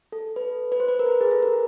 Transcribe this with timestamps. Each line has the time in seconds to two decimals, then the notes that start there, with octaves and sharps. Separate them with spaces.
0.12 A4
0.36 B4
0.72 B4
0.80 C5
0.88 B4
0.99 A#4
1.06 B4
1.21 G#4
1.31 A4
1.43 A#4